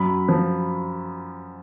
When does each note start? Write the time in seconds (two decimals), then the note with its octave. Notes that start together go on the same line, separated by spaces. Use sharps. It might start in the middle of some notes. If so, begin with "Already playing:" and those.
Already playing: F#2 B5
0.29 F3